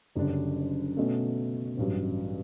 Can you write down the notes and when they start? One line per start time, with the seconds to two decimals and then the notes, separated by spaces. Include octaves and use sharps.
0.15 F#1 F#2 D3 G3 D4
0.97 B2 A3 C#4
1.77 A1 G2 F#3